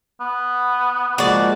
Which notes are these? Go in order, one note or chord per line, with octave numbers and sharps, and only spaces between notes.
B3
F3 G#3 A#3 F#4 D5